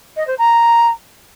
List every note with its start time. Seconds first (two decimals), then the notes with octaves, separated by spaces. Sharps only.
0.16 D#5
0.27 C5
0.38 A#5